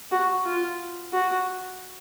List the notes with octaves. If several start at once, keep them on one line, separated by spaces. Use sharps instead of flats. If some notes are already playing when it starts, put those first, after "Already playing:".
F#4
F4
F#4